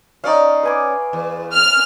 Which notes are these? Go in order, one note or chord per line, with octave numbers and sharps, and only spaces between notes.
C#4 D#4 C#5 D5 F5
B4 G#5 D6
E2
F6